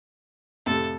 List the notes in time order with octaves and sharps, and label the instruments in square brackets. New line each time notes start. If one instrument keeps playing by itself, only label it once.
[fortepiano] F2 A2 C3 [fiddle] A4